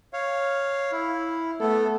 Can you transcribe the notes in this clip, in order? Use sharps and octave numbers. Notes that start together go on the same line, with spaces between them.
C#5 F5
E4
A3 B3 A4